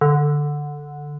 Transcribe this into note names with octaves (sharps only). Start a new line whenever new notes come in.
D3